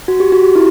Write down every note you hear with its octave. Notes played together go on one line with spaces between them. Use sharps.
F#4
G4
F#4
G4
E4